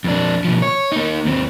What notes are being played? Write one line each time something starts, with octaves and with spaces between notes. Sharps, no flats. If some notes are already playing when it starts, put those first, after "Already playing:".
F2 D4
B2 F3
C#5
A#3 D#4
D#2 C4